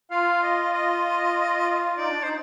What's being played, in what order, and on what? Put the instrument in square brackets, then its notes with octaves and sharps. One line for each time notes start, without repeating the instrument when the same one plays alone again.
[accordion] F4 [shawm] F5
[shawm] D#5
D#5
[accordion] D#4 [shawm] D5
[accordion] D4
[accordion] D#4 [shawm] C5